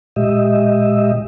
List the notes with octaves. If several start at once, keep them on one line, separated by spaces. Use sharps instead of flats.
A#2 G#3 G4 D#5 E5